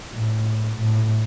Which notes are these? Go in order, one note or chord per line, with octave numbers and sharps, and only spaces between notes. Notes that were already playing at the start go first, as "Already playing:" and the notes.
A2
A2